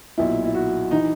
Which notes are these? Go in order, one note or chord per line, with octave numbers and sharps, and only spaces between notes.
B1 A#2 E4
E4
F#4
E3 D#4